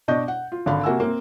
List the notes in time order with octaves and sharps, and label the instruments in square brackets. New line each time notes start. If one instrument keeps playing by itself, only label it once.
[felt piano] B2 D4 D5 D#5 C#6 G6
F#5
F4
G#1 D3 F5 B5
C3 A#3 F#4 E5 G#5 E6
A#3 C4